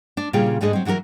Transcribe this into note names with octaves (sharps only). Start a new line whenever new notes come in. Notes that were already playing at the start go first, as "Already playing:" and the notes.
D4
A#2 C#3 G3 F4 G#4 G5
D2 G#2 D3 D4 G#4 D#5
F#3 C4
E3 F#3 F#4 G4 A#4